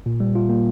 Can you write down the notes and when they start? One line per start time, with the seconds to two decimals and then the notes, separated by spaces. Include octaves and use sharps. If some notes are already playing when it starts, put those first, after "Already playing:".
0.06 A#2
0.20 G3
0.35 F4
0.49 A#3